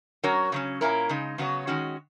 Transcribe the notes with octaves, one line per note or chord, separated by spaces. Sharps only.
F#3 C#4 F#4 A#4 C#5
C#3 F#3 C#4
A#2 A#3 C#4 E4 A#4
C#3 G#3 D#4
C#3 F#3 B3 F#4 C#5
D#3 G#3 C#4 F#4